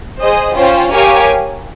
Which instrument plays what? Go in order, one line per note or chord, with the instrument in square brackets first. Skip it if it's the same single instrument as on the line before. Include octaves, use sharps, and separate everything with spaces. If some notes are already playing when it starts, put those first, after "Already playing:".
[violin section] G#4 C5 D#5
C#4 F4 C5 G5
G4 A#4 C#5 F5 G#5